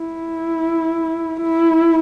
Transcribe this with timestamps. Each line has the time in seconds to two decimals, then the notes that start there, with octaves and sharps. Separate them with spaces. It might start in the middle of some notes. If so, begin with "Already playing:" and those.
Already playing: E4
1.41 E4